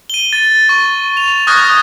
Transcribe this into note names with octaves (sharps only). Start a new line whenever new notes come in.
D#7 G7
A6
C#6
F7
C#6 D#6 F6 F#6 G#6 A#6